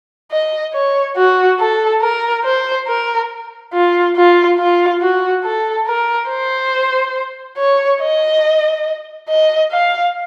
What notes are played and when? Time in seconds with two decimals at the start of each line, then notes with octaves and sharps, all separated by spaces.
0.31 D#5
0.74 C#5
1.17 F#4
1.59 A4
2.02 A#4
2.44 C5
2.87 A#4
3.73 F4
4.16 F4
4.58 F4
5.01 F#4
5.44 A4
5.87 A#4
6.29 C5
7.58 C#5
8.00 D#5
9.29 D#5
9.71 F5